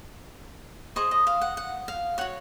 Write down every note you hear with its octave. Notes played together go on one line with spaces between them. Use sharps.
G#4 C5 D#5 C#6
D#5
F5
F#5
F#5
F5
F#4 C#5 F#5